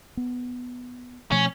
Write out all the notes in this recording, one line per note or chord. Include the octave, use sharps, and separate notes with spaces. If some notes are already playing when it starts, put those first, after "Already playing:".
B3
B2 F3 A3 C#4